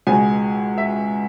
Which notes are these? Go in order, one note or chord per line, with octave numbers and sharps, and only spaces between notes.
C#2 B2 G#3 G#5
E5